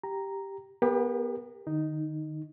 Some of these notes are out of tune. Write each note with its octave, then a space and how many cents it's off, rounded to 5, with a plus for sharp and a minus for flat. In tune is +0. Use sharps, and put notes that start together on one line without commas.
G4 +0 A#5 +0
B3 -20 G4 +30 A#4 +5
D#3 -45 D#4 +0